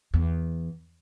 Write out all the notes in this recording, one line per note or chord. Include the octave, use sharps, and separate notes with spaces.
E2